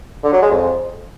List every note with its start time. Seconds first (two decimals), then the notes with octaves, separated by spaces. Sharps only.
0.24 D3
0.33 F#3
0.42 G#3
0.51 F2